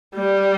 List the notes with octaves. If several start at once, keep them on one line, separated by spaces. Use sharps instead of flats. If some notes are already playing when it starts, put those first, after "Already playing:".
G3